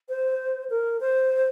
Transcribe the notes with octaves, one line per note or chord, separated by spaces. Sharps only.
C5
A#4
C5